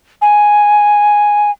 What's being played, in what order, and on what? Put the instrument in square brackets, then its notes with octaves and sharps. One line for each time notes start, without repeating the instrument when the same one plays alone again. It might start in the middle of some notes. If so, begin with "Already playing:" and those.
[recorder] G#5